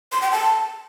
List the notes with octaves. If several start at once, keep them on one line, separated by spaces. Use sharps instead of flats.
C6
G5
A5